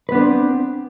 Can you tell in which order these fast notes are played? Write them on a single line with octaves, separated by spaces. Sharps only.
B4 B3 D4 C4